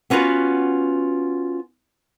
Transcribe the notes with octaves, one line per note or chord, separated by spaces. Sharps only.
B3 C#4 F4 F#4 B4